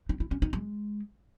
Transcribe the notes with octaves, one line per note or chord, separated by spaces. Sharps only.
D#4
E4
C#4
D#4
G#3